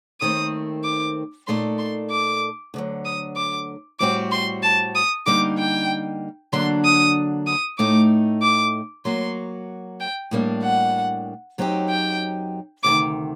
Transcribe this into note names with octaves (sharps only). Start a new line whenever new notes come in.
D#2 D#3 A3 C4 D#6
D6
A#2 A3 D#4 A4 D5 C6
C6
D6
D2 D3 F#3
D#6
D6
A2 G3 C4 F#4 D6
C6
A5
D#6
D3 G3 A#3 D#4 D6
G5
D3 F#3 A#3 D4 C6
D#6
D#6
A2 A3 D#4 D6
D6
F#3 A#3 F#4 C6
G5
A2 G3 A#3 D4
F#5
F#2 F#3 C4 D#4 G4
G5
D2 C3 D#3 D6